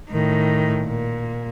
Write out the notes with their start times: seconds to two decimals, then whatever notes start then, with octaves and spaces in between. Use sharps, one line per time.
0.10 A2 D#3
0.83 A#2